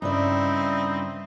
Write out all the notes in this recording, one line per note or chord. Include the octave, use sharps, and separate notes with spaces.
G2 C#3 C4 D#4 E4 D5